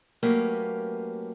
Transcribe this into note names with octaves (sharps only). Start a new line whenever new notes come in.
F#3 A3 A#3 C#4 G4 B4